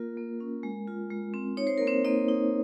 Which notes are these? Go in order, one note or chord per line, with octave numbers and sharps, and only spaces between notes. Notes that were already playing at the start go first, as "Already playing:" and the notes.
Already playing: A#3 F4 A#4
A#3
C#4
G#3
F4
G#3
C4
D#4 C#5
C5
A#3 A#4
C4 C5
A#3 D#4 D#5
D#4